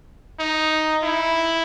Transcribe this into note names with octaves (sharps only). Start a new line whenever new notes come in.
D#4
E4